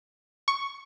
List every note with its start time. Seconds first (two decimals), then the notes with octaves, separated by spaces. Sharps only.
0.48 C#6